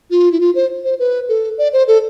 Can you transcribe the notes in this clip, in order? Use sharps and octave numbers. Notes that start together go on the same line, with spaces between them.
F4
E4
F4
C5
C5
B4
A4
D5
C5
A4